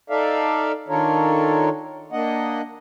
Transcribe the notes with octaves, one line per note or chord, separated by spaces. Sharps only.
D#4 A4 D5 E5 F5
D#3 D4 F4 A4 A#4 C#5
A#3 D4 D#5 F#5